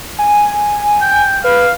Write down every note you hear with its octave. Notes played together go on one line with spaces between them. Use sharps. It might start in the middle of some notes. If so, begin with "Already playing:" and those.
G#5
G5
B4 F5